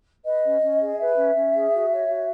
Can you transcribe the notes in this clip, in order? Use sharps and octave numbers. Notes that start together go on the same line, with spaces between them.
B4 D#5
C#4
C#4
G#4
B4 E5
C#4
C#4
G#4
F#4
C#5
F#4